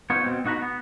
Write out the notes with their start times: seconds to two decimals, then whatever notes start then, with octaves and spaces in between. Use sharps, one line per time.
0.10 B3 D#4 F4 C5 C#5
0.24 B2 C4
0.45 B2 D#4 F#4 F#5 A#5 B5
0.62 B3